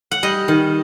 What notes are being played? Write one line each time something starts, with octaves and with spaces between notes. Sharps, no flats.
F#5
G3 D#5
D#3